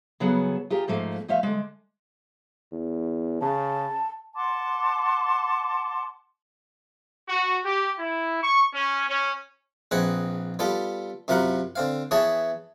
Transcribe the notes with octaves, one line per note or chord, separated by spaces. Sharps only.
C#3 F#3 B3 G#4 A4
F4 G4 G#4 A#4
G#2 F3 A3 A#3
F3 A3 E5 F5
D3 G#3
E2
C#3 A5
F#5 A5 C6 D6
F#4
G4
E4
C#6
C#4
C#4
A#1 C4 G#4 B4 D#5 F#5
G3 B3 F4 A4
F#2 C3 F4 A#4 F#5 B5
D3 C4 F5
E3 B3 G#4 C#5 A5 B5